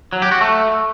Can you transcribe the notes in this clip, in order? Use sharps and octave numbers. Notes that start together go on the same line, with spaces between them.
F#3
G4
F#4
A3